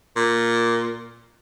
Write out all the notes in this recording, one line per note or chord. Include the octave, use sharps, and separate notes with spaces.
A#2